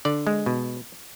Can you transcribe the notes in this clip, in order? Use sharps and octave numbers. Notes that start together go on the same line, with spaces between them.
D3 D5
G#3
B2